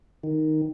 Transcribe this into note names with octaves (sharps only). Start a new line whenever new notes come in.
D#3